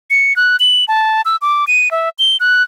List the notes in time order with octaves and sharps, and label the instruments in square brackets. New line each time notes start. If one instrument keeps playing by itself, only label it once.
[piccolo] C#7
F#6
F#7
A5
E6
D6
D#7
E5
G7
F#6